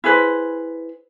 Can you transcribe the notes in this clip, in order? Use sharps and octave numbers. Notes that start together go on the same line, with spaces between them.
E4 G#4 B4 C5